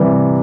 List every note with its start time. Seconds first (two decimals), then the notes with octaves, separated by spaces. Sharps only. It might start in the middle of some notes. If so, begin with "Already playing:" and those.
Already playing: C3 E3 G3